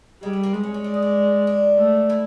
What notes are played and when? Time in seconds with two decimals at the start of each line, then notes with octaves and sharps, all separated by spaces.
0.22 G3 G#3
0.33 A3
0.43 A#3
0.54 G#3 B3
0.63 C#4
0.74 C#4
0.84 D4
0.94 D#4
1.02 D4
1.47 D4
1.78 A3
2.10 E4